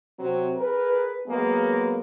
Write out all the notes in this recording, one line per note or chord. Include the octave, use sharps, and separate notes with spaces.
C3 F#3 C4
G#4 A#4 B4
F#3 G#3 A#3 B3